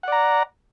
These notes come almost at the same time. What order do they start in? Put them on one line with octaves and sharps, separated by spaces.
F#5 D5 A#5